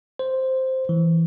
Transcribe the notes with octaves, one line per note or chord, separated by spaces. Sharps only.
C5
E3